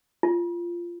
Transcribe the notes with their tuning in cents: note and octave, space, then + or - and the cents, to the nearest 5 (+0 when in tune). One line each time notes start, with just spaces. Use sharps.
F4 -15